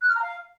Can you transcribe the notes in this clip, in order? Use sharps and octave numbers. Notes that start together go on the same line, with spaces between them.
F#6
F6
A#5
F5